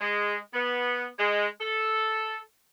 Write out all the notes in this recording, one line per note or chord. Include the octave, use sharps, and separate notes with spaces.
G#3
B3
G#3
A4